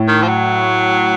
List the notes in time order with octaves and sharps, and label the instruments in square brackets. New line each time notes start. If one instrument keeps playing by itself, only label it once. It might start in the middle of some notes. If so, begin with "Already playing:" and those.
Already playing: [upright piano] A2
[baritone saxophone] D#3
F3
F#3